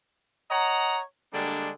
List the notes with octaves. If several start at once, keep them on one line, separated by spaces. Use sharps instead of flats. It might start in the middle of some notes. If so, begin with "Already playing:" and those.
C#5 D#5 F#5 A#5
D3 G3 G#3 A#3 D4